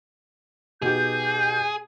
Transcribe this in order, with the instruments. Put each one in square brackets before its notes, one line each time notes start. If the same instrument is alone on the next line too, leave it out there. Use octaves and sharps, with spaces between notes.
[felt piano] B2 D#4 G4 [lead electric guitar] G#4 [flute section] G6